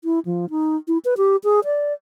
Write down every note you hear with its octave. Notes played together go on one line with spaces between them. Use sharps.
E4
F3
D#4
E4
B4
G4
G#4
D5